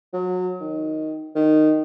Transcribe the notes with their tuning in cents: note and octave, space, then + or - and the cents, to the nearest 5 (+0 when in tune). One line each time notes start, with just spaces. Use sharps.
F#3 -25
D#3 +5
D#3 -10